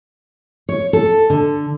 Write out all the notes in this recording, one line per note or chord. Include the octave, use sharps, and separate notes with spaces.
C#5
A4
D3